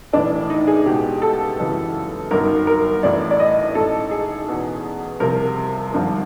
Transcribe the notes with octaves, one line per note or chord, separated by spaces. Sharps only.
A#1 A2 E3 D4
D#4
G#4
C#2 B2 G4
A4
G#1 F#2 C#3 E3
G1 F#2 D#3 A#4
A#4
A1 A2 E3 D5
D5
D#5
A1 G#2 D#3 A4
G#4
E2 B2
C2 C3 F3 A#4
G#1 G2 D3 F3